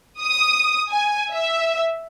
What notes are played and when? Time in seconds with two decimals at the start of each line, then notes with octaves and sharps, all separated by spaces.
0.22 D#6
0.91 G#5
1.32 E5